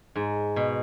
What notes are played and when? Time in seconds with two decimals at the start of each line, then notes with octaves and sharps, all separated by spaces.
0.16 G#2
0.56 B2